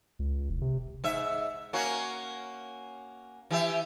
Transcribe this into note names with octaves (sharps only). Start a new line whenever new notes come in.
C#2
E1
C3
G#2 E5
A#3 C#4 F#4
E3 G4 E5